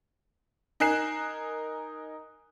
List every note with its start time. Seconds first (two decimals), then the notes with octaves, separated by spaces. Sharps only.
0.80 D#4 A#4 G#5 F#6 C7 E7